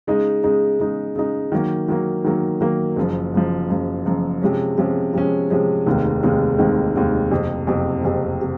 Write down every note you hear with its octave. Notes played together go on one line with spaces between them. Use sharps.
C#3 G#3 D#4
C#3 G#3 D#4
C#3 G#3 D#4
C#3 G#3 D#4
D#3 F#3 A#3
D#3 F#3 A#3
D#3 F#3 A#3
D#3 F#3 A#3
F#1 F#2 F3
F#1 F#2 F3
F#1 F#2 F3
F#1 F#2 F3
C3 F3 G#3 C#4
C3 F3 G#3 C#4
C3 F3 G#3 C#4
C3 F3 G#3 C#4
F1 D#2 D#3 G#3 C4
F1 D#2 D#3 G#3 C4
F1 D#2 D#3 G#3 C4
F1 D#2 D#3 G#3 C4
F#1 F2 C3
F#1 F2 C3
F#1 F2 C3
C3